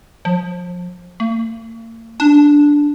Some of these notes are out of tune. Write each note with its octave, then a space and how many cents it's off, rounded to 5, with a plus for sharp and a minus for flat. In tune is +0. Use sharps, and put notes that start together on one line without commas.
F3 +30
A#3 -45
D4 -5